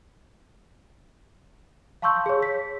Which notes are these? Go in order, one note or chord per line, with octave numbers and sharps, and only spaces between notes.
F5 A5 C6 C#6 E6 G6
G#4 C#5
B6